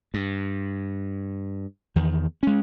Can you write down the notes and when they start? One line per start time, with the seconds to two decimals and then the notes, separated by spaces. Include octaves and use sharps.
0.14 G2
1.96 E2 D#3
2.43 G#3 C#4